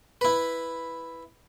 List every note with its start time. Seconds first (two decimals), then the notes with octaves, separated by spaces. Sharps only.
0.21 E4 B4